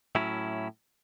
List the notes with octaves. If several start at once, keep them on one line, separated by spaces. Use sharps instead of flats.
A2 F#3 C#4 E4